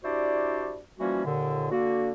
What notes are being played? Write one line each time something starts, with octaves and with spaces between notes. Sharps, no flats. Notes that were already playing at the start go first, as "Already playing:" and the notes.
D4 E4 F#4 G4 C5 D5
E3 F3 G3 A#3 C#4 F#4
D#2 A#2 D3
D3 A#3 F#4